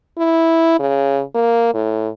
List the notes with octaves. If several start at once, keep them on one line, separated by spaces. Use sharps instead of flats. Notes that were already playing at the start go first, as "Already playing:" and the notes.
E4
C#3
A#3
A2